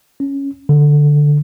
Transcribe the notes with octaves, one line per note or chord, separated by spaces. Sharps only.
C#4
D3